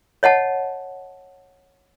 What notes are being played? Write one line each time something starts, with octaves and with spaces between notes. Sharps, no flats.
C#5 D#5 F#5 A5